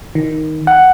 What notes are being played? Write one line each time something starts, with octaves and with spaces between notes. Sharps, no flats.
D#3
F#5